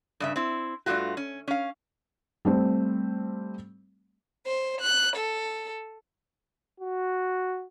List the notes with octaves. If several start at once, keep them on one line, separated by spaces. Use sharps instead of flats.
G2 C#3 E5
C4 E4
G2 B2 A3 F4 F#4
C#4
C#4 F5
G3 A3 C4
C5
F#6
A4
F#4